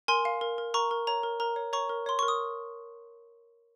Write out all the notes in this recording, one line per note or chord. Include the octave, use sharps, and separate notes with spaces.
A#4 G#5 C6
F5
A#4
A#4
A#4 A#5 C#6
A#4
C#5 A#5
A#4
A#4 A#5
C#5
C#5 A#5 C#6
A#4
C#5 C6
A#4 C#6
D#6